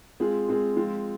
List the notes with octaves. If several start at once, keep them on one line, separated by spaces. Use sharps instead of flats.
G#3 C4 F4 G#4
G#3 C4 F4 G#4
F3 G#3 C4 F4